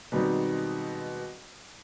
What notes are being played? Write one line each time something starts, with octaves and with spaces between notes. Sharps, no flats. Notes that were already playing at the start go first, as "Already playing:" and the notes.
B2 D#3 G3 G#3 C4 D#4